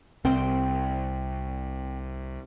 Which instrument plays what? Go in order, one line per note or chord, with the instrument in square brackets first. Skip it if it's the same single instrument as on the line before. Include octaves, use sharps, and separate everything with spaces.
[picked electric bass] C2 [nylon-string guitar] C4 G5